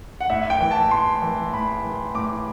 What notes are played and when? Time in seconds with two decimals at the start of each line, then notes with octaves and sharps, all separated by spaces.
0.21 F#5
0.30 A2 E5
0.50 G5
0.60 E3
0.71 A5
0.91 A2 C6
1.22 E3
1.53 A2 B5
1.84 E3
2.15 A2 D6